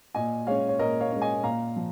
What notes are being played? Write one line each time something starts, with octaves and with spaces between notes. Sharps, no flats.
A#2 D#5 G#5
G#3 C#4 C#5 F5
C#5
A#2 A#4 D#5
C#5 F5
G#3 C#4
D#5 G#5
A#2 F5 A#5
F3